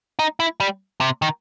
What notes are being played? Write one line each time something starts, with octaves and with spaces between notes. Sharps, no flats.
D#4
E4
G3
C3
D#3